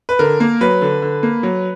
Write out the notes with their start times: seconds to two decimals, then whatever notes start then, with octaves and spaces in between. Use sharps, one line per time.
0.09 B4
0.19 D3 A#4
0.40 A#3
0.61 F#3 B4
0.82 D3
1.02 D3
1.23 A#3
1.43 F#3